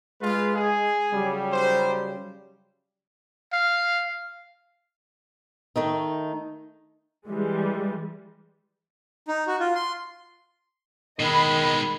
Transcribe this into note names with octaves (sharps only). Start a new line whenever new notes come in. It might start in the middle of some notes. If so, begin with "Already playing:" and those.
G#3 F4 G#4 B4
G#4
C#3 F#3 G3
D#4 C5
F5
D#3 A3 D#4
E3 G3 G#3
D#4
F#4
F4
C6
B2 D#3 G#3 D#5 B5